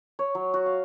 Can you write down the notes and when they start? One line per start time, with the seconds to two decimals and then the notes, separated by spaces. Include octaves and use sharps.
0.19 C#5
0.35 F#3
0.54 F#4
0.66 F5